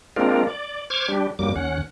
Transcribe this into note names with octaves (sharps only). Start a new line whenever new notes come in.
G#3 A#3 C4 D4 F4 A#4
D5
C5 C#6 D6 F6 G#6
G3 D4 G4
G2 F#3 G3 A#3 D6
D#2 C#4 F#5